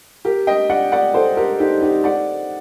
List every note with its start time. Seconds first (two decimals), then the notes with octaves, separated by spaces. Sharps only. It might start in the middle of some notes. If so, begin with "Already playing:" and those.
0.25 G4 A#4
0.47 D#5 G5
0.70 D5 F#5
0.92 D5 F#5
1.14 A4 C5
1.37 G4 A#4
1.60 D#4 G4
1.81 D#4 G4
2.04 D5 F#5